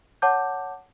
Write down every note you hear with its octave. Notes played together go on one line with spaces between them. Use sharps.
C#5 F#5 A5 D6 G6